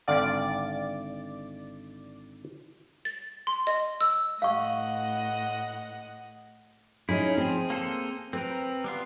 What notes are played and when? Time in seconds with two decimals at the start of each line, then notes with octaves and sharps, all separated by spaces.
0.08 G#1 D3 D5 F5 D6 A6
3.05 A6
3.47 C6
3.67 D#5
4.01 E6
4.42 A2 D#5 F5 F#5 C#6
7.09 C#4 D#4 E4 G#4
7.37 F3 C4 G#4
7.70 A#3 A4 C5
8.33 C4 A#4 B4
8.84 G3 B3 F4